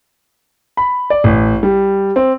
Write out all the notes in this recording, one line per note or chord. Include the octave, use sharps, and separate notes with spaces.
B5
D5
A1
G3
C4